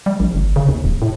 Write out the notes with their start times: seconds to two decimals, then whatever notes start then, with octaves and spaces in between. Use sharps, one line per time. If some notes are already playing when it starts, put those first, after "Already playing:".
0.06 G3
0.20 A#1
0.35 G1
0.56 C#3
0.69 D#2
0.84 D1
1.02 A2